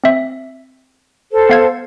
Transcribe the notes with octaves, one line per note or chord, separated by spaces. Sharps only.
C4 E5
A4 C5
B3 F5 G#6